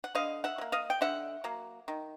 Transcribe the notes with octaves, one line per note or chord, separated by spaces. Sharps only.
F#5
D3 D#5 F5
E5 F#5
F#3
A#3
D#5 F5
G5
D3 E5 F#5
F#3 A#3
D#3